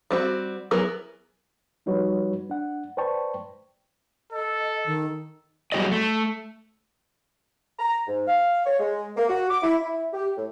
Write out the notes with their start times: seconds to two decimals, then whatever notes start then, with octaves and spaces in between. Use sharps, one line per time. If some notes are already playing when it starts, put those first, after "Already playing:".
0.11 G3 C4 F#4
0.71 F#3 B3 E4 G#4 A#4
1.86 F3 G3 D#4 F#4 B4 C#5
2.49 D4 F#5
2.97 B4 C5 D5 G5 A5 C#6
4.32 A4 D#5
4.86 D#3
5.72 F#3 G3 F#4 G#4 D5 D#5
5.92 A3
7.79 A#5
8.07 G#2
8.28 F5
8.66 C#5
8.80 G#3
9.17 A#3
9.29 F#4
9.50 D6
9.63 E4
9.81 E4
10.13 G4
10.36 A2